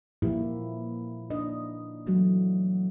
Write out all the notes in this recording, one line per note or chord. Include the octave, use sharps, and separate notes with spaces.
A#2 F3 A#3 E4 G4
D4 D#5
E3 F#3 A3 F#4